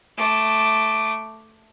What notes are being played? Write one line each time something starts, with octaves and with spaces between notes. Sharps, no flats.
A3 D6